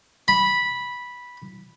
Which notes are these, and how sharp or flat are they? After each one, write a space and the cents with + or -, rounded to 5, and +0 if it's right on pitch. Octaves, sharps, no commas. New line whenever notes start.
B5 -10